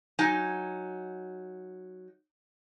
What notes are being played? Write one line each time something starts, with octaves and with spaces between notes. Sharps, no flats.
F#3 D#4 G#5